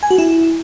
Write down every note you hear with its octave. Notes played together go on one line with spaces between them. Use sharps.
G#5
F#4
E4